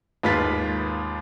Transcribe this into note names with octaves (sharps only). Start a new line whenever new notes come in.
D#2 G#2 F4 B4 A6 B6